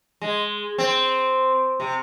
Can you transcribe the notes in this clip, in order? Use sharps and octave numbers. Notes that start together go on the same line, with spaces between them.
G#3
C4
C3